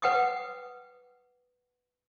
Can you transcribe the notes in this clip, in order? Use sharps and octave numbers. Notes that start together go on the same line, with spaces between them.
B4 F#5 G5 D6 D#6